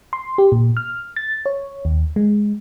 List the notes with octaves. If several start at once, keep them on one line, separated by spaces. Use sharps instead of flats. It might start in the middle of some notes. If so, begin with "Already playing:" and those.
C6
G4
A#2
F6
A6
C#5
D#2
G#3